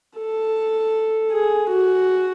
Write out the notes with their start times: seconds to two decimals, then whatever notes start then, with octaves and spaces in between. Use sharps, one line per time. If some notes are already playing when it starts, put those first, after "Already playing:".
0.18 A4
1.32 G#4
1.69 F#4